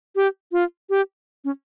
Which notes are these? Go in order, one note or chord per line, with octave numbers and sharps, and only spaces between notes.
G4
F4
G4
C#4